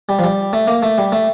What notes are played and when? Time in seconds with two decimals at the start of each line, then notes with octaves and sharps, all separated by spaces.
0.09 G3
0.19 F3
0.24 G3
0.53 A3
0.67 A#3
0.83 A3
0.98 G3
1.12 A3